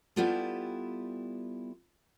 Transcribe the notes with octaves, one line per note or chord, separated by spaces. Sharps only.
G3 B3 E4 F4 G4 A4